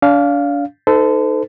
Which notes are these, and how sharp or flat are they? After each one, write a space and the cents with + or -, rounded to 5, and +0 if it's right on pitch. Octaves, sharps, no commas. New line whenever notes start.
D4 -35 F5 +0
D#4 +0 A4 +0 C5 -40